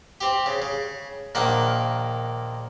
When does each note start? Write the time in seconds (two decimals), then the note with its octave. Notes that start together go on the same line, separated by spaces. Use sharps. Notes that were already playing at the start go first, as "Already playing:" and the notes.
0.21 C4 G4
0.46 C#3
0.62 C#3
1.35 A#1 D#3 A#3 F#5